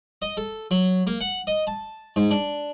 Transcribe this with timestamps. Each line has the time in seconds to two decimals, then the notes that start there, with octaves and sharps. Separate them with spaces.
0.22 D#5
0.37 A4
0.71 F#3
1.07 A#3
1.21 F#5
1.47 D#5
1.67 A5
2.16 G#2
2.31 D4